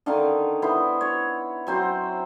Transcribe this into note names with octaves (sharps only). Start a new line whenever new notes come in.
D3 D#3 F5
B3 E4 C5
C#5
F#3 C4 C5